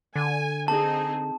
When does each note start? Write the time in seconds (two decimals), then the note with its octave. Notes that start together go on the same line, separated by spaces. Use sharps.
0.16 D3 G#5
0.68 C4 D#4 G#4 A5